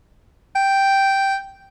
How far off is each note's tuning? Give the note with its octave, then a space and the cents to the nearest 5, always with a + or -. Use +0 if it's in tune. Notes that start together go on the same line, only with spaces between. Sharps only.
G5 -5